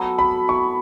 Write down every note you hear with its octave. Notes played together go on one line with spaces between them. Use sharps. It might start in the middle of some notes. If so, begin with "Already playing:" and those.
Already playing: F#3 B3 A4
B5
E3 B3 E4 C#6